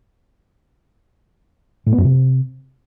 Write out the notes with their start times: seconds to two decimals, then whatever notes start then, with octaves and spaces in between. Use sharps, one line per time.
1.86 A2
1.92 B3
1.98 F#2
2.04 C3